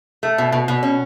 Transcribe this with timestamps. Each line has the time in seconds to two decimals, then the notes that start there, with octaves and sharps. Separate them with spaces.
0.23 A3
0.38 B2
0.52 B2
0.68 B2
0.83 C#4